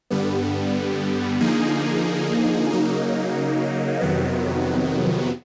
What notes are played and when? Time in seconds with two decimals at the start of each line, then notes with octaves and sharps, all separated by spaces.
0.11 G2 D3 G3 B3
1.41 D3 F3 A#3 D#4 G#4
2.71 C#3 F#3 A#3 D#4
4.01 F2 C3 D#3 F#3 B3